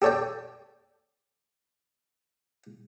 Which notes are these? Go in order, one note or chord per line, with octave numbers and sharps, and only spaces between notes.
G4 A4 C#5 D5 G5